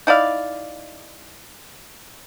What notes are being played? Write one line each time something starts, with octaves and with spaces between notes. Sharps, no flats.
D#4 E4 D5 F5